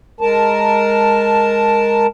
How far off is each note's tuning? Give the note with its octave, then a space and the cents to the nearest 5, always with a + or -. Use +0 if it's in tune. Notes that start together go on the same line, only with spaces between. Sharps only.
G#3 +0 A#4 +0 A5 +0